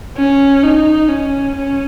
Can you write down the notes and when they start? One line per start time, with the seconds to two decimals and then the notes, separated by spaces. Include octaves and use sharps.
0.17 C#4
0.64 D#4
1.09 C#4
1.55 C#4